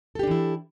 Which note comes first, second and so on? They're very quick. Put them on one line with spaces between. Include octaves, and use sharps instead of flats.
A4 G4 D4 E3 E4